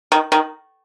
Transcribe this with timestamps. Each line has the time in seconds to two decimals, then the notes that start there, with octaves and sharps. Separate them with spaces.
0.12 D#3
0.32 D#3